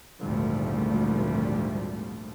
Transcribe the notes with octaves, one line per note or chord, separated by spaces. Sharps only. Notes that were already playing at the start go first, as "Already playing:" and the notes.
G#1 D2 A#2 F3 G3 A3